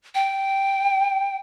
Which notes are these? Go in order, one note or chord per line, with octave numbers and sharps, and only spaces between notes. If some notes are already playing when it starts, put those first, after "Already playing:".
G5